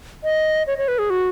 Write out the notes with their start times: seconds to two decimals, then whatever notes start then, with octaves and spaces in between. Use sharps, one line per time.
0.24 D#5
0.67 C#5
0.78 C#5
0.88 B4
0.99 G#4
1.10 F#4